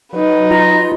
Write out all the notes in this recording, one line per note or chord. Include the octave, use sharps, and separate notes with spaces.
F#3 D#4 B4
F4 A#5